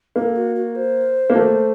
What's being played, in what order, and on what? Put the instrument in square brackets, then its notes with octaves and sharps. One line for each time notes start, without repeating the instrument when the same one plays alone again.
[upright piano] A#3 [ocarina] A4
[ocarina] F#4
F#4
C5
[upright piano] A#3
A3